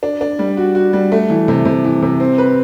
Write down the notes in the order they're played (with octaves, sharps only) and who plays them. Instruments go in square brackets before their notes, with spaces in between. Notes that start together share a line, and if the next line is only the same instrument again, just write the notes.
[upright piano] D4
D4
G3
F#4
F#4
G3
A3
E3
C3
C3
E3
C3
C4
B4